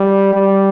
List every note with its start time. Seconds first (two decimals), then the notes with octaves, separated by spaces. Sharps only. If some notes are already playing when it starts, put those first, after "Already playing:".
Already playing: G3
0.33 G3